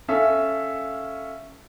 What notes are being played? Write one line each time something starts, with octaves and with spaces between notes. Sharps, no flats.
C#4 A4 E5 F5